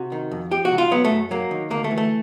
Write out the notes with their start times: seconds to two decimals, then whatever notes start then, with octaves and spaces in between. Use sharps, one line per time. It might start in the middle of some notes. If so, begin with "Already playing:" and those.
Already playing: C3 F#4
0.12 D#3
0.31 F2
0.51 F3 G4
0.65 F#4
0.72 C#2
0.78 F4
0.91 F#3 B3
1.05 A3
1.11 F#2
1.31 F#3 A#3
1.51 D#3
1.70 D2 A#3
1.84 A3
1.91 E3
1.98 A3